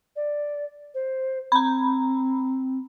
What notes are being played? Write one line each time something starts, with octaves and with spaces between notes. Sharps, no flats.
D5
C5
C4 A#5 B5